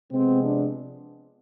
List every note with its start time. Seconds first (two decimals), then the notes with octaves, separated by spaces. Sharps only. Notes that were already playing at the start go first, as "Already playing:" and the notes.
0.12 C3 F3 G#3 B3 C4
0.42 D4